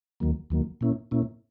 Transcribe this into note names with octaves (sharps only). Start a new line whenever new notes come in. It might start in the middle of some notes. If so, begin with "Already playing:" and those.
D#2 D#3 F#3 A#3
D#2 D#3 F#3 A#3
A#2 A#3 C#4 E4
A#2 A#3 C#4 E4